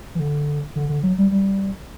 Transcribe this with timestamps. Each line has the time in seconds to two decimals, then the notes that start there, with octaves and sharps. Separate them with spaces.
0.15 E3
0.20 D3
0.76 D3
0.89 D3
1.03 F#3
1.18 G3
1.31 G3